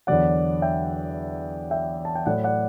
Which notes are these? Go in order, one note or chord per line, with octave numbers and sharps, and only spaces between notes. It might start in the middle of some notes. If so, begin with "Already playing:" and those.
E2 D3 F#3 D5 F#5
E5 G5
E5 G5
A5
G5
A2 F#3 D5 F#5
D5 F#5